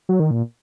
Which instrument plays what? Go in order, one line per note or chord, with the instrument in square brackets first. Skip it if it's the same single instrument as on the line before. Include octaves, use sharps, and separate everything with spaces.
[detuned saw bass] F#3
D#3
A#2